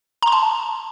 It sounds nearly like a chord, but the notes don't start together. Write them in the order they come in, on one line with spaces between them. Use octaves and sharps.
A#5 C6 A5